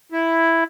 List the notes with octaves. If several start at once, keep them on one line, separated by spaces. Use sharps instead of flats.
E4